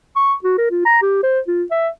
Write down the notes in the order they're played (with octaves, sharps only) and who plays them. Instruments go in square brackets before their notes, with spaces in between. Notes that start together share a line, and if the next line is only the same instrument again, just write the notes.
[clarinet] C#6
F#4
A#4
F4
A#5
G4
C5
F4
E5